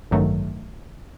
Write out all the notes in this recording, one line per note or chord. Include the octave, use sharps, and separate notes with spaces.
A1 G2 D#3 F#3 A3